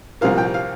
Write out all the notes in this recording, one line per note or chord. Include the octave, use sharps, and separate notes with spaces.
C2 C3 F3 A#3 F5
G5
F5